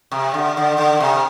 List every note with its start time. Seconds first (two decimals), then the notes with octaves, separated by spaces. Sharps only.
0.12 C3
0.34 D3
0.57 D3
0.78 D3
1.00 C3